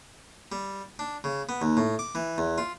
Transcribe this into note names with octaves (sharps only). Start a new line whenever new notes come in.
G3
D4
C#3
B3
D#2
A2
D6
E3
E2
F4